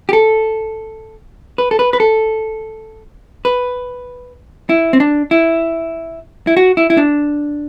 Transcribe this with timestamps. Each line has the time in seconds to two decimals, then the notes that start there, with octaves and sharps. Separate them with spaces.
0.09 G4
0.13 A4
1.58 B4
1.71 A4
1.79 B4
1.93 B4
2.00 A4
3.45 B4
4.69 E4
4.93 C4
5.00 D4
5.31 E4
6.47 E4
6.57 F#4
6.77 E4
6.90 E4
6.97 D4